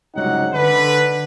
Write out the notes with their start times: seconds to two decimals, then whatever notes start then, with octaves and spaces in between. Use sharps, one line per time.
0.15 C#2 G2 C3 F#3 D#4 F#5
0.53 D3 B4